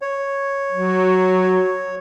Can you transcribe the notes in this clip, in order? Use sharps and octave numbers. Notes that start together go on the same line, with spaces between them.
C#5
F#3